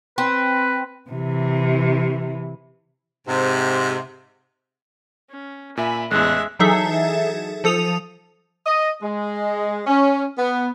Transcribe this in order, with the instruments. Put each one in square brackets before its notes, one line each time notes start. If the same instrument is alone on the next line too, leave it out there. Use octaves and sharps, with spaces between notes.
[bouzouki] C4 [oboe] B4
[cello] C3 E3
[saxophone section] G#2 C3
[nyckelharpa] C#4
[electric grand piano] A#2 E5 [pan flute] G#5 [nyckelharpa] B5
[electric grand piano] A1 E2 [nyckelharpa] G#3 E5 [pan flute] F#6
[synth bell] E3 F#3 D#4 G#4 A4 E5
F3 A4 D#6 F7
[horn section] D#5
G#3
C#4
B3